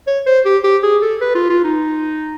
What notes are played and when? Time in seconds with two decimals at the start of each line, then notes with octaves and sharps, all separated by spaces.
0.07 C#5
0.27 C5
0.45 G4
0.64 G4
0.83 G#4
1.02 A4
1.21 B4
1.35 F4
1.50 F4
1.64 D#4